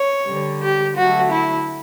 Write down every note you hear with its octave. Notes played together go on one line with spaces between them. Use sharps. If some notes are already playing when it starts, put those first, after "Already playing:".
Already playing: C#5
D3 G3
G4
D3 F#3 A3 F#4
E4